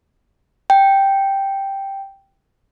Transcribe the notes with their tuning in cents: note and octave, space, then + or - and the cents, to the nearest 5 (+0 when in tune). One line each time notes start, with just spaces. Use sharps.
G5 +0